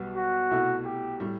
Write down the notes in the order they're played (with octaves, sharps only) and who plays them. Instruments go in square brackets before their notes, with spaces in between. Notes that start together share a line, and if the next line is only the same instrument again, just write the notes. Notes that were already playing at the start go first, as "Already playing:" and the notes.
Already playing: [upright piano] B1 B2 G3 B3
[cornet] F#4
[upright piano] C2 B2 A3 E4
[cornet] G4
[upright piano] A2 G3